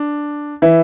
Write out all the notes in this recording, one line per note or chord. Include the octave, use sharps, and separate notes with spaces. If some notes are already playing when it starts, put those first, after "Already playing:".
Already playing: D4
E3 E4